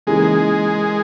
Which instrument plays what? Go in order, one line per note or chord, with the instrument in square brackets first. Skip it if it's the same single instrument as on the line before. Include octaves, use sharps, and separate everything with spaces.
[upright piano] C#3 E3 A#3 D#4 G#4 [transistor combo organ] G#3